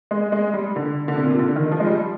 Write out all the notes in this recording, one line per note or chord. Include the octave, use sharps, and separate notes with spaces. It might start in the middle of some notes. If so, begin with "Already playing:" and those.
G#3
G#3
G3
D3
D3
C3
A#2
C3
D3
D#3
F3
G#3
G3